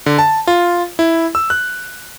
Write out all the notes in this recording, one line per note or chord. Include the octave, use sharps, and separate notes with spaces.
D3
A5
F4
E4
E6
F#6